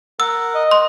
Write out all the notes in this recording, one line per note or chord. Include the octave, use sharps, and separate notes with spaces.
A#4 F#5 E6
D#5
C6